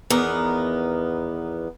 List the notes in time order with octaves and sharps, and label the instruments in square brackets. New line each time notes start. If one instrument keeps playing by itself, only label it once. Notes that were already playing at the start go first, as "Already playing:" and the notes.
[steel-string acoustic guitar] E2 D#3 B3 A#4